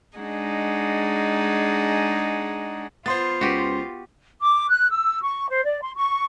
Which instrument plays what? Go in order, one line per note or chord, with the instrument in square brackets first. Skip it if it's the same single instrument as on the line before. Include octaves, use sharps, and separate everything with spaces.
[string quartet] G#3 D4 D#4 F#4 G#4
[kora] B3 [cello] F4 [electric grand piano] C5 C6 A6
[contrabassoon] C#2 [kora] F#4 G4 B4
[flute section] D6
F#6
E6
C#6
C5
D5
C6
C#6